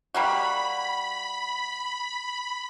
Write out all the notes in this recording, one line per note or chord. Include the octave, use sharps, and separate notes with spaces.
G3 A#3 F#4 B5